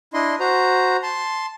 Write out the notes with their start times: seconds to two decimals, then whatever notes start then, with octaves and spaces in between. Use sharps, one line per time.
0.14 D4 E4 D#5 C6
0.40 F#4 C5 A#5
1.03 A5 C6